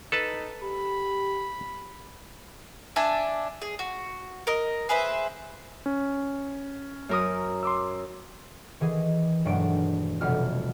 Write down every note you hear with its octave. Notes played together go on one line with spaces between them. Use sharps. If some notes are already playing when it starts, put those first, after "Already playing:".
D#4 A4 B4 A5
G4 B5
D4 E5 G#5 A5
G#4
F#4
A#4 D#5
G#4 B4 C5 E5
C#4
F#2 A#4 D#6
C6 D6 E6
D#3 E3 G#4 D#5
E1 G2 F#3 A3 D7
F1 B2 G3 F6